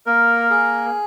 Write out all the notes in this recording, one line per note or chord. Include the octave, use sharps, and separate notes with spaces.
A#3 A#4
G#4